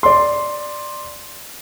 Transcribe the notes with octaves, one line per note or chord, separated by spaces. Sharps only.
D5 C6